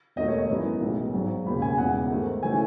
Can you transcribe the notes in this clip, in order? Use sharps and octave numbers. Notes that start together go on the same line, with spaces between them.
E1 D#2 D#3 A3 D#5
C#5
D#5
F#2 E3 B3 D#4
B1 A2 E3 G#3
G#1 G#2 F#3
E1 D#2 C#3 B5
G#5
E1 E2 C#3 E3 F#5
G#2 D#3 A3
C#3 E3 A3 C#4 G#5